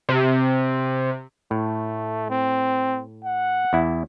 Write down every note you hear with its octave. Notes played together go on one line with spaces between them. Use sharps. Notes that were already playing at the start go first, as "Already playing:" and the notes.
C3
A2 A3
C4
F#5
E2 E4